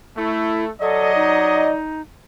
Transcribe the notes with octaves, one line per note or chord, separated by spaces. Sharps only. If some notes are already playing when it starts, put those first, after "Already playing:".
A3 E4
F#3 A4 D5 D#5
D#4